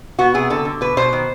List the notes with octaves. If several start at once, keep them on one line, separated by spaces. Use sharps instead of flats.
B3 F#4
C3 G#4
D3 A4
D3
B2 B4
B2 C5
D#3